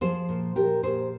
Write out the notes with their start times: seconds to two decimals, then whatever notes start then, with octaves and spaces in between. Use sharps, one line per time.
0.01 F3 G#4 C5
0.29 A#2
0.55 F3 G4 A#4
0.83 A#2 G#4 C5